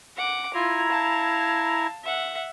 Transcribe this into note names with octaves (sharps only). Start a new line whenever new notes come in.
F#5 D6
E4 F4 A#5 G#6
F5 A5
E5 F#5